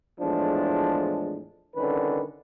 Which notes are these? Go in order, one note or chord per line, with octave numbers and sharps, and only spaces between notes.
E2 A2 F3 G#3 D4
C2 D3 D#3 C#4 B4